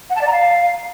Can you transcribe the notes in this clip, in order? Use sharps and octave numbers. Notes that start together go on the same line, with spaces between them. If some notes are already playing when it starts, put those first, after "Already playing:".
F#5
A5
D5
A#5
F5